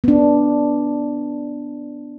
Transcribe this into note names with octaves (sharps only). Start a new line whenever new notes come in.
B3 D4